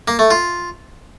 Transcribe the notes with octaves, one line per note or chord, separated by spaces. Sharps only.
A#3
A3
F4